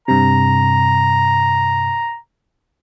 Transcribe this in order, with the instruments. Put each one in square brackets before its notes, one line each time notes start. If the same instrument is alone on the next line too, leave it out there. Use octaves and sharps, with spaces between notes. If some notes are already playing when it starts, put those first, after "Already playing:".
[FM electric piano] G2 C3 [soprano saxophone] A#5